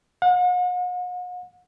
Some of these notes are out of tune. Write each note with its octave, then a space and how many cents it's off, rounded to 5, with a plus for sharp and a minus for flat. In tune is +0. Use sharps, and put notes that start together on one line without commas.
F#5 -45